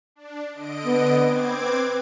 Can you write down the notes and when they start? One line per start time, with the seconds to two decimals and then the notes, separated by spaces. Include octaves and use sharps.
0.16 D4
0.52 D3 D#5 D7
0.84 B3
1.20 C4 D6 G#6
1.61 B4